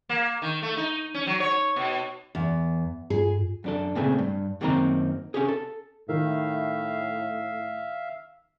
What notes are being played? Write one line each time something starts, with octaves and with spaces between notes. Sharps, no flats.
A#3
D#3
A3
D#4
C#4
F#3
C#5
B2
E2
G2 F4 G#4
F#2 D4 A4
A#2 C#3 A3 C4 G#4
G2
F#2 D#3 A#3 C4 D#4 A#5
C#4 G4 G#4
A4
A2 D#3 E5 F5